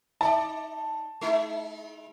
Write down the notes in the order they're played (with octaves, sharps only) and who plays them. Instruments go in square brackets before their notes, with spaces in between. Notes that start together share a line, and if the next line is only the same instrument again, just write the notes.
[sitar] D#4 C5 D5 [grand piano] A5
[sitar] G#3 D#4 E4